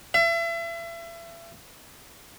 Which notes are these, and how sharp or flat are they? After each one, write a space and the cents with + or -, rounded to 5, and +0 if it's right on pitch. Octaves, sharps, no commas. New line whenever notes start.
E5 +35